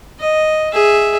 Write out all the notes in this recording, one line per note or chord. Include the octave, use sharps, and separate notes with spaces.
D#5
G#4 E5